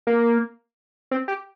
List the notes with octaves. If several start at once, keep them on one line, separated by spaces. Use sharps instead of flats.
A#3
C4
G4